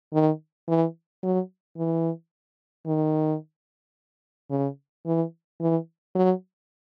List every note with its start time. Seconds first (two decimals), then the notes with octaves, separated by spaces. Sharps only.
0.13 D#3
0.68 E3
1.23 F#3
1.77 E3
2.86 D#3
4.50 C#3
5.06 E3
5.60 E3
6.15 F#3